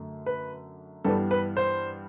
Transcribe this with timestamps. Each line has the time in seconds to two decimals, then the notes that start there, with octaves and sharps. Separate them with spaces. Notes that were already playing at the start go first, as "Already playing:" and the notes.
Already playing: F#2 D3 A3
0.26 B4
1.04 G2 E3 G3 B3 A4
1.31 B4
1.57 C5